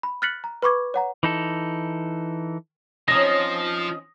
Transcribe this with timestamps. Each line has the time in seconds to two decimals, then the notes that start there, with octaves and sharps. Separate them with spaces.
0.03 B5
0.22 F6 F#6 A6 B6 C#7 F#7
0.44 A#5
0.62 B4 B5 C#6 D6 G#6
0.94 C#5 F#5 A#5
1.23 E3 D#4 A4
3.08 F3 C4 C#4 D#4 D#5 D#6 A#6